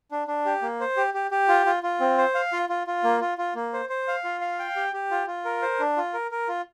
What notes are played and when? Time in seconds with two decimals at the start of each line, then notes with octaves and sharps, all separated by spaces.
0.11 D4
0.27 D4
0.45 G4
0.62 A#3
0.80 C5
0.97 G4
1.14 G4
1.31 G4
1.48 F4
1.66 F4
1.83 F4
2.00 C4
2.17 C5
2.34 F5
2.52 F4
2.69 F4
2.87 F4
3.04 A#3
3.21 F4
3.38 F4
3.55 A#3
3.73 C5
3.89 C5
4.08 F5
4.24 F4
4.41 F5
4.59 G5
4.76 G4
4.93 G4
5.11 F4
5.27 F4
5.45 A#4
5.62 C5
5.80 D4
5.97 F4
6.13 A#4
6.31 A#4
6.48 F4